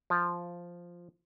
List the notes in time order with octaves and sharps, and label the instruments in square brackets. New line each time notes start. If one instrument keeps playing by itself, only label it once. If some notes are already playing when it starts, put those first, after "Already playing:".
[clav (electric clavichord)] F3